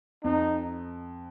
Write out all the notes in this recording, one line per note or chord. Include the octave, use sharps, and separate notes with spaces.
F2 D#4